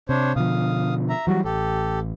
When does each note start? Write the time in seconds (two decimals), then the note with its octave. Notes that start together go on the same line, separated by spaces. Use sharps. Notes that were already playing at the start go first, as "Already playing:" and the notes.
0.09 C3 D4 C5 C#5
0.36 B2 D3 F3 F5 D#6
1.09 E5 A#5
1.27 E3 F#3 G3 F#4
1.45 A1 G4 A4